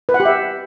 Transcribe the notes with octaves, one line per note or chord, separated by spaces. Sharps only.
B4
F#5
G4
E5